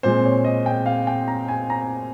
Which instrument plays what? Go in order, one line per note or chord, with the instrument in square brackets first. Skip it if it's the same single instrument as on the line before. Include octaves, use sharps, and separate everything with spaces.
[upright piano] A#2 G#3 C4 C5
C#5
D#5
G5
F5
G5
A#5
G#5
A#5